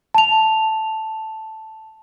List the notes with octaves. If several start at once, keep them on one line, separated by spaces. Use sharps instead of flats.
A5 F7